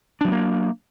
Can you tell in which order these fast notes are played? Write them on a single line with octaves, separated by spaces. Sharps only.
D4 F#3 B3 A#3